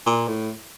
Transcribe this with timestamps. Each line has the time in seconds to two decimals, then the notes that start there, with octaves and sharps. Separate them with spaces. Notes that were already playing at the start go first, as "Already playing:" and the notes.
0.06 A#2
0.28 A2